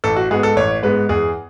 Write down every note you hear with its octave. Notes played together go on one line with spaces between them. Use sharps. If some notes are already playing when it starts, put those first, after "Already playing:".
A1 A4
F#4
G#2 G#3 B3 G#4
A4
A1 C#5
G#2 G#3 B3 B4
E2 G#4